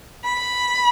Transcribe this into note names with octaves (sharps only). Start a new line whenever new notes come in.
B5